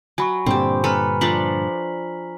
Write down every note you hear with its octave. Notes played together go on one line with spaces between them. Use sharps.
F#3 G#5 B5 C#6
G2 A#2 D3 C4 G4
A4 B4 G#5 A#5 B5 F6
F3 D4 A4 A#5 B6 F#7